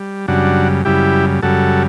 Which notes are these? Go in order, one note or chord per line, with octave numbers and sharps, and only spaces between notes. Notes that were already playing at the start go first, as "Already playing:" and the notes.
Already playing: G3
F#2 C#3 G3 D4 F#4
F#2 C#3 G3 E4 G4
F#2 C#3 G3 F#4 A4